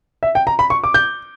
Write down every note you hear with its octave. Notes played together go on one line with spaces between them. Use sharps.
E5
G5
A#5
B5
C#6
D6
G6